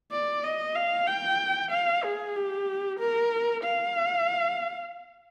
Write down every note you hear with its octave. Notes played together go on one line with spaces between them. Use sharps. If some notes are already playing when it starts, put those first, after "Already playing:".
D5
D#5
F5
G5
F5
G#4
G4
A#4
F5